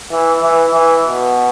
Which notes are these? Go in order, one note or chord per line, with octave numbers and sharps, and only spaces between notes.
E3
E3
E3
B2